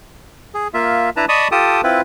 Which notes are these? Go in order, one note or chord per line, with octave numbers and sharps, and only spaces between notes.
G#4
A#3 F4 E5
D4 E4 B4 A5 A#5
D5 D#5 A5 B5 C#6 D#6
F4 G4 A4 G5 A5 D#6
C4 E4 F4 B4